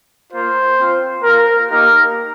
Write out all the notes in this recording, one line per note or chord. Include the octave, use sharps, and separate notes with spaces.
A#3 F4 C5
C4 F4
A#3 F4 A#4
A#3 D#4 G4 A#4